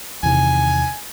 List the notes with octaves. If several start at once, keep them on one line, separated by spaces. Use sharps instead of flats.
E2 C3 D#3 G#5